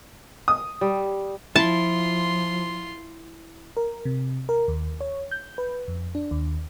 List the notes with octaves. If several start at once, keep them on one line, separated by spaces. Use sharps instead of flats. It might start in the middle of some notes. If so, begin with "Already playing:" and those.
D#6
G3
F3 E4 F4 A5 C6
A#4
C3
A#4
D#2
C#5
G6
B4
F2
D4
D#2